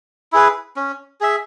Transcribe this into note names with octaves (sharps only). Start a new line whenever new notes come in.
E4 G#4 B4
C#4
G#4 E5